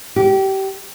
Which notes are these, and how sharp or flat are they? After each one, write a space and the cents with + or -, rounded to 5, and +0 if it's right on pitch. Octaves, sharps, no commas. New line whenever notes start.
G4 -25